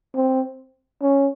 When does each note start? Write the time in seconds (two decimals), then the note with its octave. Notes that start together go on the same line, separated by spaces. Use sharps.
0.15 C4
1.02 C#4